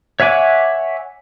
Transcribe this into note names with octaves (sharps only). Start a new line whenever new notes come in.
C#5 E5 F#5 G#5 D6